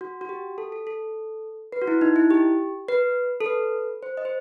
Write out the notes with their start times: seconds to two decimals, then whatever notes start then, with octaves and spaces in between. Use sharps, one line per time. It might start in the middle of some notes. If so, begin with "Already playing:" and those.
0.01 F#4
0.21 F#4
0.29 G4
0.58 A4
0.72 A4
0.87 A4
1.72 B4
1.81 F#4
1.87 E4
2.01 D#4
2.16 E4
2.31 G4
2.89 B4
3.41 A4
3.46 B4
4.03 C5
4.17 D#5
4.25 C5